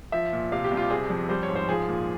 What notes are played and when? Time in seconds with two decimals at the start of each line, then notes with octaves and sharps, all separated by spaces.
0.12 F3 E5
0.33 A#2
0.52 C3 F5
0.64 G4
0.71 C2
0.77 F4
0.90 C3 G#4
1.10 F2
1.29 G3 C5
1.43 C#5
1.49 G#2
1.55 C5
1.69 F3 G#4
1.88 A#2